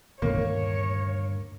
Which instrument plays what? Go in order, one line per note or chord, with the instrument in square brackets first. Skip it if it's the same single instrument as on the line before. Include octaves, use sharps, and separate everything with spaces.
[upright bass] D2 G2 [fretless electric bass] A#2 D#3 B3 [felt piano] A#3 [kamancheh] C#5